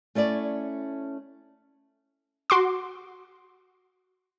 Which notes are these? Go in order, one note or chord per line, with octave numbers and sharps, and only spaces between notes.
A3 C#4 E4 D5
F#4 C6 D6